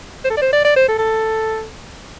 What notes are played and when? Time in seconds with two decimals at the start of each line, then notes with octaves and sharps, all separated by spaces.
0.25 C5
0.30 A4
0.37 D5
0.42 C5
0.53 D5
0.65 D5
0.76 C5
0.88 A4
0.99 A4